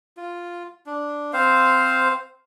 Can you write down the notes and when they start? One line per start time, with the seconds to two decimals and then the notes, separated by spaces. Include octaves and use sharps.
0.17 F4
0.86 D4
1.33 C4 C5 F5